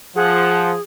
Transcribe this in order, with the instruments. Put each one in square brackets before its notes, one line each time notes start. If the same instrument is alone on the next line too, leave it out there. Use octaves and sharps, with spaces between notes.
[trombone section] F3 [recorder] G#4 [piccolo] F#5